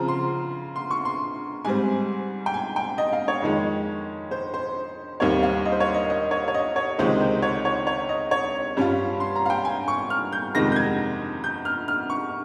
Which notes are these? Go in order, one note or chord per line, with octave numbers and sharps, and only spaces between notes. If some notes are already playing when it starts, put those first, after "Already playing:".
Already playing: C#3 F3 C4 A#5
C6
C6
C#6
C6
G#2 G3 C4 G#5
G5
G#5
G5
D#5
F5
C#5
F2 D#3 G#3
C5
C5
D#2 D#3 G3 C4 C#5
F5
D#5
C5
C#5
D#5
D#5
C#5
C#5
D#5
C#5
C#2 C3 D#3 G#3 D#4 C5
C5
C#5
C#5
C#5
D#5
C#5
G2 G3 C#4 F4
C6
A#5
F5
G5
G#5
C#6
F6
G6
F2 C3 D#3 G#3 A#6
G6
G#6
G6
F6
F6
C#6